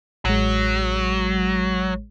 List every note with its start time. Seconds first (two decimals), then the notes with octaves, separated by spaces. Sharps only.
0.25 A1 F#3 G#3